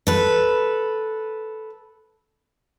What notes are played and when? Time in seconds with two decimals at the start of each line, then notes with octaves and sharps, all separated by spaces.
0.07 A4 B4